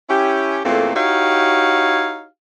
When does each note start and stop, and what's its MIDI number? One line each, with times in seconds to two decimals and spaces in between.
0.10 0.60 61
0.10 0.60 64
0.10 0.60 67
0.65 0.92 40
0.65 0.92 46
0.65 0.92 57
0.65 0.92 58
0.65 0.92 60
0.65 0.92 69
0.95 2.26 63
0.95 2.26 64
0.95 2.26 66
0.95 2.26 67
0.95 2.26 73
0.95 2.26 77